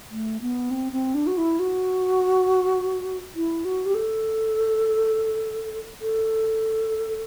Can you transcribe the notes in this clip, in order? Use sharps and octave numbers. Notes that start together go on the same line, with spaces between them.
A3
B3
C4
C4
D4
F#4
E4
F#4
E4
F#4
G4
A4
A4